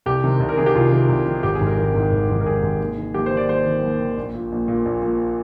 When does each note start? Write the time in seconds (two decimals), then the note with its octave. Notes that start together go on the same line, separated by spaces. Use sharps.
0.06 C2 G4
0.24 C3 D#3
0.40 C2
0.49 A#4
0.57 C3 D#3 G#4
0.66 G4
0.75 C2 F4
0.92 C3 D#3
1.09 C2
1.26 C3 D#3
1.43 G#1 G4
1.55 G#4
1.60 G#2 D#3
1.67 A#4
1.78 G#1 A#4
1.94 G#2 D#3
2.11 G#1
2.29 G#2 D#3
2.41 A#4
2.45 G#1 G#4
2.62 G#2 D#3
2.80 D#2
2.98 D#3
3.14 D#2 G4
3.26 D#3 C5
3.37 D5
3.49 D#2 C5
3.66 D#3
3.83 D#2
4.00 D#3
4.18 A#1
4.34 A#2
4.52 A#1
4.68 A#2
4.85 A#1
5.03 A#2